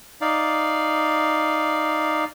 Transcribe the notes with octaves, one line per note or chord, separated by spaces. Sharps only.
D#4 D5 F5